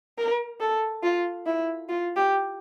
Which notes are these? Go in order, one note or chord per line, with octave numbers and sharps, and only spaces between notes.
A#4
A4
F4
E4
F4
G4